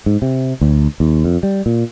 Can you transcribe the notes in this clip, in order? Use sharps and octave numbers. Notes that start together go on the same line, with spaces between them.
G#2
C3
D2
D#2
F2
G3
A#2